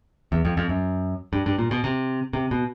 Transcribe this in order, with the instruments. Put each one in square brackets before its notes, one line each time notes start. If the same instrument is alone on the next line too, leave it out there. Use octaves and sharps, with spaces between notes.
[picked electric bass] E2
F2
F2
F#2
G2
G2
A#2
B2
C3
C3
B2